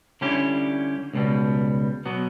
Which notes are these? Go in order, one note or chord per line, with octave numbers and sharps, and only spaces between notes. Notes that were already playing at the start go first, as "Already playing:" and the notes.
D3 G3 C#4 E4 G4
C#2 B2 G3
B2 F#3 B3